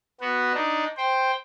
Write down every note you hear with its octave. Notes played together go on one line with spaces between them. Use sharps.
B3 F#4
D4 D#4
C5 G5